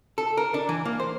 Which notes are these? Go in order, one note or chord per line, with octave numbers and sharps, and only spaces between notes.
A4
A#4
D4
E3
A#3
C5